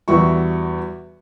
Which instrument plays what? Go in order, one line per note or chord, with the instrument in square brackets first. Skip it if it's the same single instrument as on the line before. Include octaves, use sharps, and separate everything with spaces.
[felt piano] E2 G3 F#4 E5 C#6